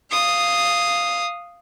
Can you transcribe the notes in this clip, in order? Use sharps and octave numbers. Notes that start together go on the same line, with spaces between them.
F5 D#6